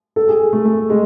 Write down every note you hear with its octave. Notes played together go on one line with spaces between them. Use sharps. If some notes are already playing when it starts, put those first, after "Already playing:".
A4
G#4
A3
A3
G#3